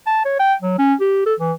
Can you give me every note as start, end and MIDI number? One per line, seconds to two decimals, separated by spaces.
0.07 0.21 81
0.25 0.36 73
0.40 0.54 79
0.62 0.75 54
0.79 0.94 61
1.01 1.24 67
1.26 1.34 69
1.40 1.53 52